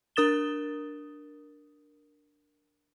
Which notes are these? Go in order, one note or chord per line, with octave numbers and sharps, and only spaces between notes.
D4 A#4 D#6 A6 E7 G7